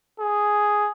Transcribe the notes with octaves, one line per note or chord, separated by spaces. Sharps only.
G#4